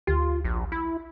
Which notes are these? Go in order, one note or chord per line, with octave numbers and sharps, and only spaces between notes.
D2 F4 G4
A#1
E4